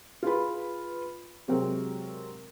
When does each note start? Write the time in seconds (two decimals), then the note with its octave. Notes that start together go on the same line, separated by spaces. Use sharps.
0.23 F4 G#4 B4 B5
1.48 C3 F#3 G#3 C4 A#4